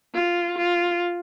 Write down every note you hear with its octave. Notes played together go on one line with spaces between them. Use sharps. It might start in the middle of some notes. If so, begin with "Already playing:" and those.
F4
F4